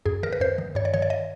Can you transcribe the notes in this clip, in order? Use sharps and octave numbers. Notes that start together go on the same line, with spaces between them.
F#2 G#4
D#3 A#4
B4
F#2 C5
D#3
G2 C#5
D5
D#3 C#5
D5
D#5